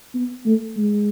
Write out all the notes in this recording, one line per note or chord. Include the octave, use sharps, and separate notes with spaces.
B3
A3
G#3